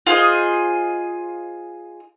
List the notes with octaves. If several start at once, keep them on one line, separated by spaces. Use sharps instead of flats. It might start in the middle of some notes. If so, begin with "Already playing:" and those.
F4 G#4 C5 D#5